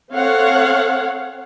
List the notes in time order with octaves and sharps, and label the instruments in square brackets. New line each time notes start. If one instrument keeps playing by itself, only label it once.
[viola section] C4 A4 C#5 F5 F#5